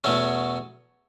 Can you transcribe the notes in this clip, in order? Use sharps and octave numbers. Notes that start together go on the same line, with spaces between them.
E2 B2 F#3 A3 C#4